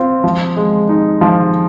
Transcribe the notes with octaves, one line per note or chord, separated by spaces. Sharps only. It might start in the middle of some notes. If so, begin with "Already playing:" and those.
Already playing: C4 F4
F3
G#3
D#4
F3